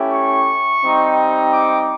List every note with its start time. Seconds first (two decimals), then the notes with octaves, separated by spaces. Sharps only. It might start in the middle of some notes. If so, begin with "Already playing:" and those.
Already playing: A3 C#4 E4 G4
0.10 C#6
0.82 G3 C4 D#4 G4
1.53 D6